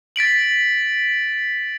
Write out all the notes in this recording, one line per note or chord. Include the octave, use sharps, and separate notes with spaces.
A6 B6 D7 F#7